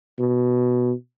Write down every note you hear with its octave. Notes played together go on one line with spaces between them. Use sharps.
B2